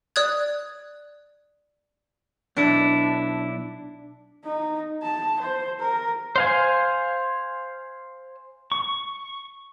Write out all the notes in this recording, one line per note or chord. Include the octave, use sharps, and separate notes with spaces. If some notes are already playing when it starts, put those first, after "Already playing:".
D5 D#6 F#6 G#6
B1 D4 E4
D#4
A5
C5
A#4
C5 F5 G#5
C#6